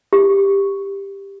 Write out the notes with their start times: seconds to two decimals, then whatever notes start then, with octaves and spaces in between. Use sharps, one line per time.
0.13 G4